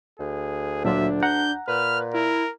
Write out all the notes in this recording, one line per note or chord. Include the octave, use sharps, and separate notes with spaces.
D2 G#4
A#2 F#3 D4 F4 E5
F#5 A#5 G6
A#2 B4 F6
E4 A#4